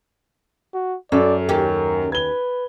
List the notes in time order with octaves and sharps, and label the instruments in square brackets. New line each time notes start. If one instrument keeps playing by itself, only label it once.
[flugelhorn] F#4
[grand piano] F#2 [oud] A4 [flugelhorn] D5
[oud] D#2 C#4 G4 [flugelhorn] A#4
[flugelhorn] B4 [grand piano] G#6 G7